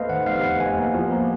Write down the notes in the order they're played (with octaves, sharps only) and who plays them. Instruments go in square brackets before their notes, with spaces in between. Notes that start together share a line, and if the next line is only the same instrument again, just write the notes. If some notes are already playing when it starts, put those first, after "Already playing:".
Already playing: [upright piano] A3 [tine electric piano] B4 C5 D#5 F5
[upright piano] D#3 [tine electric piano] F#5
[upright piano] F1 [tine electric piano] F5
[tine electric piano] F5
[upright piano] F1 [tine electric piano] F#5
[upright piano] F1 [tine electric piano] G#5
[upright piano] A#3
F3
A#3